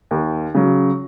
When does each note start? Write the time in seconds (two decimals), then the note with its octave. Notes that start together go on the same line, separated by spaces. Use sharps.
0.11 D#2
0.54 C#3 F#3